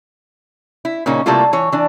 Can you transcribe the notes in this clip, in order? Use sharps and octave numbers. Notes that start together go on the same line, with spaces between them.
E4
A#2 C#3 A#3 C#4 D#4
C3 G3 A3 A#3 E4 F4
E3 C#5
E3 D4